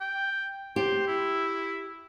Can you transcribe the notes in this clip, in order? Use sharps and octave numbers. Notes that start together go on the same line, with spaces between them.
G5
G4 C5
E4